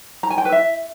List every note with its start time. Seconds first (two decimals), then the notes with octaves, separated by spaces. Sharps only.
0.23 A#5
0.31 G#5
0.38 G5
0.45 B4
0.52 E5